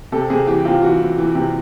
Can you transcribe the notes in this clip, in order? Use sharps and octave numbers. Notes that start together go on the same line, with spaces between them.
C3 A4
C3 G#4
E3 G4
C3 F4
E3 F#4
E3
E3
C3